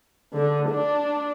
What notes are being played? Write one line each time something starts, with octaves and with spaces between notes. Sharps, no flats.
D3
D4